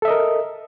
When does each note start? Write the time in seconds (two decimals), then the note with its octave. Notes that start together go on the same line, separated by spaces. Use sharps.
0.02 A4
0.05 E5
0.08 D#5
0.11 A#4